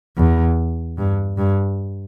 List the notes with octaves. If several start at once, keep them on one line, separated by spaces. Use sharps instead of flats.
E2
G2
G2